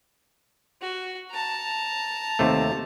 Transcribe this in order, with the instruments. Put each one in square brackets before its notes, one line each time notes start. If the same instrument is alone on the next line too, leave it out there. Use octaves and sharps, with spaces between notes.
[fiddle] F#4
A5 A#5
[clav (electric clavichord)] D#2 C3 A3